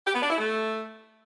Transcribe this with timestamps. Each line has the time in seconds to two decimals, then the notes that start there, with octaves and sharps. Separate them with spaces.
0.06 G4
0.14 B3
0.22 D4
0.30 E4
0.38 A3